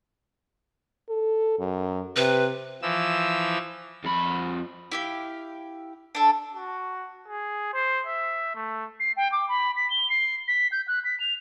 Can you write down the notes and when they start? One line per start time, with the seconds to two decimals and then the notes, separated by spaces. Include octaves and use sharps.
1.09 A4
1.59 F#2
2.16 C3 B4
2.82 E3 F3 E6
4.04 F2 B5
4.91 E4 G4 F5
6.15 D4 A4
6.55 F#4
7.28 G#4
7.74 C5
8.07 E5
8.55 A3
9.00 C7
9.17 G5
9.32 D6
9.48 B5
9.76 B6
9.90 G7
10.10 C7
10.48 B6
10.72 G6
10.88 F#6
11.05 B6
11.20 F7